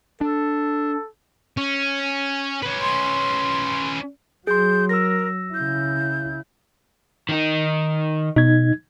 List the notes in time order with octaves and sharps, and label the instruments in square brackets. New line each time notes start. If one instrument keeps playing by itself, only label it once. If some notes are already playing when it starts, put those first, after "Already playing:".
[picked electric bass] D4 [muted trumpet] A4
[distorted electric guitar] C#4
C#4 B4
[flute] C6
[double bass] F#3 [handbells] G#4 C6 [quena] G6
[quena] A#4 [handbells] E6 A#6
[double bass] C#3 E4 [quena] G6
[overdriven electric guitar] D#3 D#4
[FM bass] B2 [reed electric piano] D#4 G#6